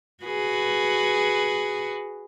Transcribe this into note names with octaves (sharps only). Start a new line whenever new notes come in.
F#4 G#4 B4